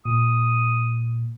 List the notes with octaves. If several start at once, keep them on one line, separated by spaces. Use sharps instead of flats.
A#2 D#6